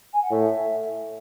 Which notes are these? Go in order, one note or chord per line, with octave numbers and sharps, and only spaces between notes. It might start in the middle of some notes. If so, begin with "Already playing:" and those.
G#5
F#5
A2 E5